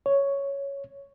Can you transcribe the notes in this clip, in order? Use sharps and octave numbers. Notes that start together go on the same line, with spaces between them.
C#5